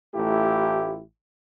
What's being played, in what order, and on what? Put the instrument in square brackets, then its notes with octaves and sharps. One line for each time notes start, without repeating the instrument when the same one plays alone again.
[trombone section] A1 A3 E4 F4 G4